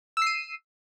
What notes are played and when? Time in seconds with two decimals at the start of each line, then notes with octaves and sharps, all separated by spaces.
0.17 E6
0.22 C7
0.27 D#7